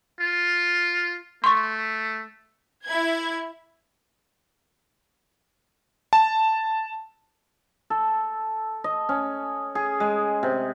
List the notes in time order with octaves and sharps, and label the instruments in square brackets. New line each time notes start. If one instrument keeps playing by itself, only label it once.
[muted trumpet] F4
[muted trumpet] A3 [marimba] C6 C#6
[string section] E4 G#6
[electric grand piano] A5
[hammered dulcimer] A4
D#5
C#4
G#4
G#3
C3